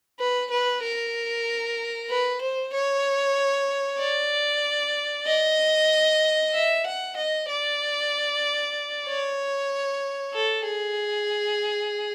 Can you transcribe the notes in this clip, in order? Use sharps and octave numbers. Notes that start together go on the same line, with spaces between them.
B4
B4
A#4
B4
C5
C#5
D5
D#5
E5
F#5
D#5
D5
C#5
A4
G#4